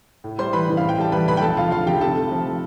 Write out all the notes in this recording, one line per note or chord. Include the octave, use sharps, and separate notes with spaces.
A2
G3 C5 C6
E3 B4 B5
A1
F5
A2
G5
G3 A5
E3 B4 B5
B1 B4 B5
G5
F2 A4 A5
F1 F4 F5
D3 F4 F5
F1 G4 G5
C3 A4 A5
A3
F3